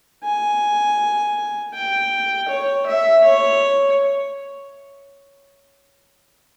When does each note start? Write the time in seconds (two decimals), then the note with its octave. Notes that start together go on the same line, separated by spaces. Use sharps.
0.24 G#5
1.74 G5
2.49 C#5
2.87 E5
3.24 C#5